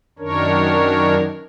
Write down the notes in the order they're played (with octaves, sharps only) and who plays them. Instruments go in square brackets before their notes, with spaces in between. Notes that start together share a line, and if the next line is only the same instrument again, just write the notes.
[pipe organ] F#2 D#3 D4 A#4 C#5